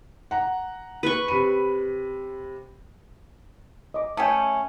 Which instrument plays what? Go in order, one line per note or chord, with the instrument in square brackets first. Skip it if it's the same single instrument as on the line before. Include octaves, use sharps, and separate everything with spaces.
[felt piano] F#5 A#5
[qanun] B4 C#6
[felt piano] C3 B5 D#7
[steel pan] D#5 D6
[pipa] A3 C#4 [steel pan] G5 G#5 D#6